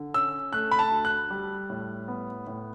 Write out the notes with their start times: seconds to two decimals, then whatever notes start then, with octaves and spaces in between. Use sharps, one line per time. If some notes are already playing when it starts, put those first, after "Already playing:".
Already playing: D3
0.14 C#4 E6
0.53 A3 F#6
0.71 B5
0.79 A5
0.91 D2
1.05 F#6
1.30 G3
1.70 A2
2.08 B3
2.47 A2